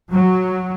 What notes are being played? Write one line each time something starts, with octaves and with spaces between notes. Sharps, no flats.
F#3